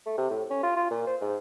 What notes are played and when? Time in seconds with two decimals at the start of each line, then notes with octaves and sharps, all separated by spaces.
0.06 A3
0.18 C3
0.31 A2
0.50 C#4
0.63 F4
0.77 F4
0.90 A#2
1.07 C5
1.21 G#2